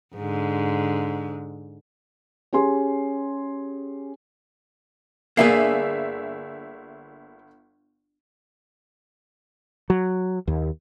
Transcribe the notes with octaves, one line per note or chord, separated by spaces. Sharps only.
G#2 D3
C#4 G4 G#4 G#5 C6
G1 A#3 D4 G#4 E5 C7
F#3
D#2